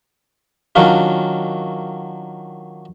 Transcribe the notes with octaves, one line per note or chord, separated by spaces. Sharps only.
D#3 F#3 C#4 D4 F4